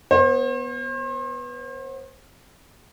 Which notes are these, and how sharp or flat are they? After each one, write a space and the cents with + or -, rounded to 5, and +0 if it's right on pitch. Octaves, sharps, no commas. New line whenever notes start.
B3 -5 C5 +40